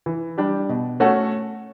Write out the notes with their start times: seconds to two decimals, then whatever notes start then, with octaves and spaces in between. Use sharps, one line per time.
0.06 E3
0.38 G3 D4 G4
0.69 B2
1.00 A3 C#4 F#4 A4